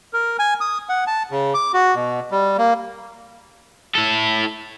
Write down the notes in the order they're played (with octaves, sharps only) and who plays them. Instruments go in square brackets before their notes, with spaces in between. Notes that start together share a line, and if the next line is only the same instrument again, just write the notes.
[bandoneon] A#4
G#5
D#6
F#5
A5
C#3
D6
F#4
B2
G3
A#3
[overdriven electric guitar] E4 A4